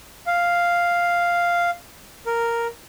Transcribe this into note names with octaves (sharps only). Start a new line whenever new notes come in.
F5
A#4